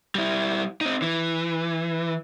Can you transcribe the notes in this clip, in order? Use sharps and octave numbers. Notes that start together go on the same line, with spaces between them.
G3 E4
C4 D#4
E3